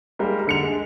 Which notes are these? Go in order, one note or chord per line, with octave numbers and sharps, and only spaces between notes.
G3 G#3 A#3
D3 C#7 F7
G#3